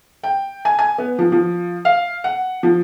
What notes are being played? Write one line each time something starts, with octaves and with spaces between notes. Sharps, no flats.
G5
G#5
G#5
B3
F3
F3
F5
F#5
F3